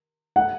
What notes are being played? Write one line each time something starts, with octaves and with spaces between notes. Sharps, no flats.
F#5